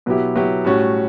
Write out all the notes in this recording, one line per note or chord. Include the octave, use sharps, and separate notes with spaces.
B2 F#3 B3 E4 G4
B2 F#3 B3 E4 G4
A2 G3 C#4 F#4